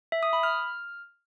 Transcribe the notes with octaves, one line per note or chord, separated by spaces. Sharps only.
E5
D#6
B5
F6